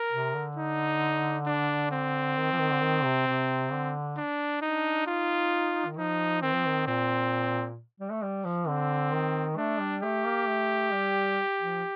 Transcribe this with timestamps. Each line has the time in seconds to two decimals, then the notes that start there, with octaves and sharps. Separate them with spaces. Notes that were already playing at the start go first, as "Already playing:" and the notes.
Already playing: A#4
0.12 C3
0.34 D3
0.57 D#4
1.46 D4
1.92 C4
2.37 D#3
2.52 F3
2.59 D#3
2.71 D3
2.82 D#3
3.04 C3
3.26 C3
3.72 D3
4.17 D4
4.61 D4 D#4
5.07 D#4 F4
5.86 D#3
5.97 F3 D#4
6.42 D#3 C4
6.54 F3
6.67 D#3
6.87 A#2 C4
8.00 G3
8.11 A3
8.22 G3
8.45 F3
8.67 D3 C4
9.13 D#3
9.57 A3 D4
9.80 G3
10.03 A3 G4
10.25 A#3
10.47 A3
10.93 G3
11.60 F3